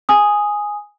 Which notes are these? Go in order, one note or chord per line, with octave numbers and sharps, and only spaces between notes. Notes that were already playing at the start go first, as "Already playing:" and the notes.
G#5 D#6